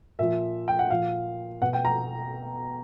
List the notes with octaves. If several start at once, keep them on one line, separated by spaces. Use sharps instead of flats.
A#2 F3 E5
G5
F#5
A#2 F3 F5
B2 F#5
G5
A#5